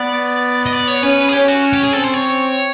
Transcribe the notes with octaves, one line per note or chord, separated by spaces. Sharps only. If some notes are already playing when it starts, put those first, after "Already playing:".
Already playing: B3 D5
D#5
D5
C#5
C#4 B4
G#4
C#4 G4
F#4
G4
G#4
C4 A4
C5
C#5